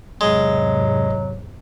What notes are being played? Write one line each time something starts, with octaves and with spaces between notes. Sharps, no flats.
E2 G#2 C3 F#3 G#3